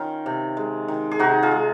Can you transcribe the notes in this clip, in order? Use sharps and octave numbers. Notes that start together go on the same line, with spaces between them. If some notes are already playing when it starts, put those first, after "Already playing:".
Already playing: D#3 C#4 F4
C3
G#3
D#3
G#4
C3 D#4 F#4
F4 G#4
G#3